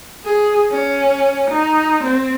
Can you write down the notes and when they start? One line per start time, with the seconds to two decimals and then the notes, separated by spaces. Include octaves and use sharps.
0.25 G#4
0.71 C#4
1.50 D#4
2.03 C4